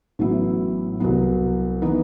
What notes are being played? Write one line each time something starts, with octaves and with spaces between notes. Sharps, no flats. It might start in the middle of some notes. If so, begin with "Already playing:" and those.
A1 A2 F#3 B3 E4
C2 C3 F#3 B3
E3 B3 D#4